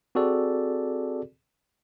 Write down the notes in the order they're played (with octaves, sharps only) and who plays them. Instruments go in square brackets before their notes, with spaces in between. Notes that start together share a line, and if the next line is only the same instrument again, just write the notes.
[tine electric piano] C4 F#4 G#4 A4 D5